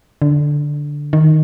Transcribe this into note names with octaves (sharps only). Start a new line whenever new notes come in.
D3
D#3